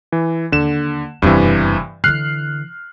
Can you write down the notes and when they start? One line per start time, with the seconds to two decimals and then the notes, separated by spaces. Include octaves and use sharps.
0.12 E3
0.52 D#2 D3 E7
1.22 F#1 E2 G2 C3 E3
2.04 D3 E3 F6 F#6 C7